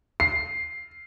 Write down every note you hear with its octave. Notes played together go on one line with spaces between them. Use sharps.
C7